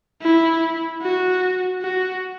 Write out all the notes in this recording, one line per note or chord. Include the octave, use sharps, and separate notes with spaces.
E4
F#4
F#4